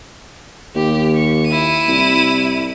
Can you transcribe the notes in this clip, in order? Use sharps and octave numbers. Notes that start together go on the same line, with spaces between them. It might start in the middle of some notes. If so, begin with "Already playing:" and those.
D#2 G4
C#6
E4 D#7
C2